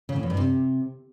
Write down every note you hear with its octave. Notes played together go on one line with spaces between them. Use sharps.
C#3
A2
E2
G2
C3